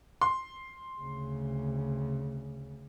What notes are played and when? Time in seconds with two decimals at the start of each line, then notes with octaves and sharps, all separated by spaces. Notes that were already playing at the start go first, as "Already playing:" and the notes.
0.22 C6
1.00 D2 C#3